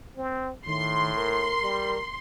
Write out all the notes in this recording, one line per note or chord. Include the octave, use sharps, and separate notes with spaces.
C4
A2 D#3 C6
A#4
G3